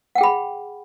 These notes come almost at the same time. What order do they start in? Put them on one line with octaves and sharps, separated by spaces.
F#5 G5 G#4 B5